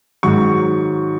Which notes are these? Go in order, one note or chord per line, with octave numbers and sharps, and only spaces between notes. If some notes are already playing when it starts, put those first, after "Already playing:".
G#2 D#3 F#3 C#6